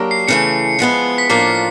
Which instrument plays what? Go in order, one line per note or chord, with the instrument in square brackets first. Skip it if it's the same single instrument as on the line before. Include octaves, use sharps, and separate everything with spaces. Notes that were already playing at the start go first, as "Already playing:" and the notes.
Already playing: [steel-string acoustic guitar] F#3 A#3 D4 G4 A#4
[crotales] C7
[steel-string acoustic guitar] C#3 E3 A3 [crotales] C#7
[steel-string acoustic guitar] F3 G#3 B3 E4
[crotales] B6
[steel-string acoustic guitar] A2 F3 A#3 D4 F4 [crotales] C7
[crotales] B6